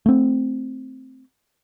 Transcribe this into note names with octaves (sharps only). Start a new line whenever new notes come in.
A3 C4